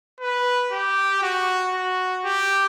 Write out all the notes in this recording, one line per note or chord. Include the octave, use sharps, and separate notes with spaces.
B4
G4
F#4
F#4
G4